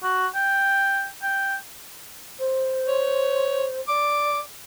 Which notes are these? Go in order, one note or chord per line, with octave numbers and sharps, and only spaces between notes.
F#4
G5
G5
C5
C#5
D5 D6